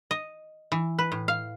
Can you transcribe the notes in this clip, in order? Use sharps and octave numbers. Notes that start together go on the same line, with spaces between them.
D#5
E3
B4
A2
F5